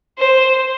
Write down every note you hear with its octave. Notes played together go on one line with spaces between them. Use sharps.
C5